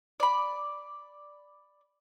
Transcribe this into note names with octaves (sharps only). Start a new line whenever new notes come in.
D5 B5